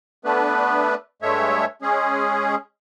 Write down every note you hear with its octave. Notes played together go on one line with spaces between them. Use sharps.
A3 B3 D4 B4
G2 G#3 A3 C#5 E5
G#3 C#4 G#4